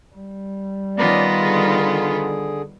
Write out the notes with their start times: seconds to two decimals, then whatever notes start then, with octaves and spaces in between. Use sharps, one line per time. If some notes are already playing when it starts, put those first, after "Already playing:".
0.15 G3
0.97 D#3 B3 C#4 F4 D5
1.41 D3 G#4